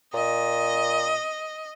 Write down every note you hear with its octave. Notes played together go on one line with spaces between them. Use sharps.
A#2 D#5